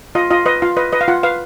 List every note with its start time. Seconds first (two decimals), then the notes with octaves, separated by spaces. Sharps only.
0.15 F4 D#5
0.31 F4 D#5
0.46 B4 D#5
0.62 F4 F5
0.77 B4 D#5
0.92 B4 D#5
1.01 F5
1.08 F4 F#5
1.23 B4 F5